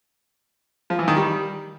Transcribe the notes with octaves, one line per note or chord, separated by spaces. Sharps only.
F3
E3
D#3
G3